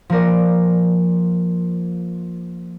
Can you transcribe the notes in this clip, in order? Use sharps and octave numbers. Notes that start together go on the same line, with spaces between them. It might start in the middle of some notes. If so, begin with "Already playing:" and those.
F3 A#3 A#4 D5